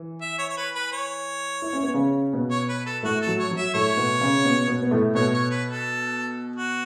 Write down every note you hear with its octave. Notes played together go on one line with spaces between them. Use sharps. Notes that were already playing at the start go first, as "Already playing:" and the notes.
Already playing: E3
E5
C#5
C#5
B4
B4
C#5
E4
C#4
B3
C#3 C#4
B2 B3
C#5
B4
A4
A2 A3 F#4
A4
F#3
C#5
F#3
E5
A2 A3 C#5
B2 B3
C#3 C#4
B2 B3
B2 B3
B3
A2 A3
B2 B3 C#5
C#5
B4
A4
F#4